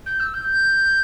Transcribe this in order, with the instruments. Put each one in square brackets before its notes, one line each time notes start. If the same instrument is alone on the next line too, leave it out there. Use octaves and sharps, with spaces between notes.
[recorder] G6
E6
G6